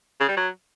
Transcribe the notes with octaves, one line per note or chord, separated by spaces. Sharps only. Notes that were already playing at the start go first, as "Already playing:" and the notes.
C#3
G3
F#3